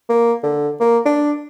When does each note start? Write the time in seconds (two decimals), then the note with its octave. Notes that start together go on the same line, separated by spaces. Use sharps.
0.09 A#3
0.43 D3
0.80 A#3
1.06 D4